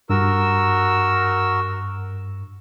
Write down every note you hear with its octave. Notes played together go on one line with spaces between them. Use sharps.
G2 F#4 A#4 E6